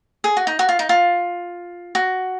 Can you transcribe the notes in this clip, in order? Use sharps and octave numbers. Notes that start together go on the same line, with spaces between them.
G#4
F#4
D#4
F#4
F4
D#4
F4
F#4